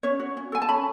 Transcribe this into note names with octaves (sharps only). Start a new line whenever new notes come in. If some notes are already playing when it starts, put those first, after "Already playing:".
C#4 C#5
F#4
C#4
A4 G#5
A5
C#4 B5